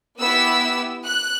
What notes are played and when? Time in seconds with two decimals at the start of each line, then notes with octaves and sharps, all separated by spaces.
0.20 B3 E4 G4 E6
1.04 F#6